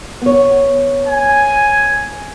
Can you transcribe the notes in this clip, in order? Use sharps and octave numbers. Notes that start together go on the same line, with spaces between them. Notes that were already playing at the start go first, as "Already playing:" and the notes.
B3 C#5
G#5